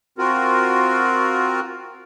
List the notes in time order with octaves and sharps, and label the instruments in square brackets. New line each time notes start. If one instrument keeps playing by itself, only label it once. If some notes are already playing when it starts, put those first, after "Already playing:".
[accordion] C4 F4 F#4 A#4